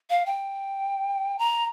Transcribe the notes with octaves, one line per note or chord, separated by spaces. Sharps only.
F5
G5
A#5